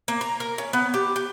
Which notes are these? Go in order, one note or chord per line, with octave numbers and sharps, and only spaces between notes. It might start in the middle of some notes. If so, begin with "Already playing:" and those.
A#3
A#5
A#4
C#4
B3
G4
G4